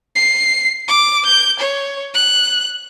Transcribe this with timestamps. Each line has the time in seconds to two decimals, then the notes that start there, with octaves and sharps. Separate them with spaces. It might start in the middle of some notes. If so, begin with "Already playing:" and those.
0.15 C7
0.88 D6
1.26 G6
1.60 C#5
2.14 F#6